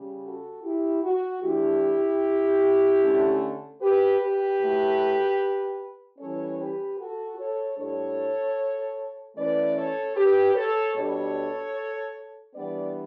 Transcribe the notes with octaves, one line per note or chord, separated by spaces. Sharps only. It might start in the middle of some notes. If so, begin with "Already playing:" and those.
Already playing: C#3 G3 C#4
F#4 A4
E4 G4
F#4
E3 A3 D4 E4 G4
D3 A3 C#4
G4 B4
G4 B4
A2 F#3 A3
E3 G3 C#4 A4 C#5
G4 B4
F#4 A4
A4 C#5
A2 G3 D4 A4 C#5
E3 A3 C#4 B4 D5
A4 C#5
G4 B4
A4 C#5
B2 G3 D4 A4 C#5
E3 G3 B3 D4 B4 D5